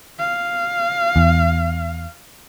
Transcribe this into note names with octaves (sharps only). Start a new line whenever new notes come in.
F5
E2